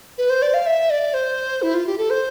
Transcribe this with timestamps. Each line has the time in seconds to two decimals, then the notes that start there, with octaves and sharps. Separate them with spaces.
0.18 B4
0.30 C5
0.42 D5
0.54 F5
0.66 E5
0.90 D5
1.14 C5
1.62 E4
1.74 F4
1.87 G4
1.98 A4
2.10 C5